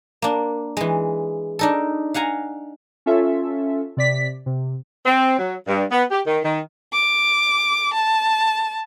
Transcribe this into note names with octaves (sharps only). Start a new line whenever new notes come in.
A#3 D4
E3 G#3
D4 D#4 A4
F5 F#5 G#5 A#5
C#4 F4 A4 E5
C3 D5 B6
C3
C4
F#3
G2
B3
G4
D#3
D#3
D6
A5